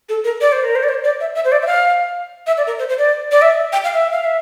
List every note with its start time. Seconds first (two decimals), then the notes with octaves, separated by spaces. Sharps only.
0.09 A4
0.24 A#4
0.41 D5
0.52 C5
0.64 A#4
0.75 C5
0.83 D5
0.89 C5
1.04 D5
1.20 E5
1.35 E5
1.45 C5
1.52 D5
1.62 E5
1.67 F5
2.47 E5
2.57 D5
2.67 A#4
2.79 C5
2.89 C5
2.98 D5
3.32 D5
3.42 E5
3.73 G5
3.84 F5
3.94 E5
4.12 F5
4.24 E5